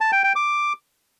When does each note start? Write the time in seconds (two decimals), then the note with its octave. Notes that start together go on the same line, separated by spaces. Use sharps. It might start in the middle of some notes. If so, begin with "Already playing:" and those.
0.01 A5
0.12 G5
0.24 G5
0.36 D6